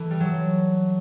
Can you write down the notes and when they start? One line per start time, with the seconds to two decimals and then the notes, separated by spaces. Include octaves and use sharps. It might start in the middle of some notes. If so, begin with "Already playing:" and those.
Already playing: E3 A3
0.10 G3
0.20 F#3